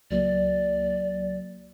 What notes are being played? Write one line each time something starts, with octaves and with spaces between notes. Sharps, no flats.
C#2 F#3 A#3 D5